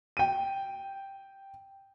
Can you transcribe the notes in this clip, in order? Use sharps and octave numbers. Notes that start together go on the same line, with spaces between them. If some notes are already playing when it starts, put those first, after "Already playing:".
G5 D#7